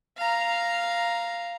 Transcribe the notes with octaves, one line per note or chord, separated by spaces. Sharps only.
F5 A#5